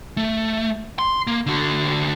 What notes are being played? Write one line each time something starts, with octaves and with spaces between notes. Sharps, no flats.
A3
C6
A#3
D3 F#4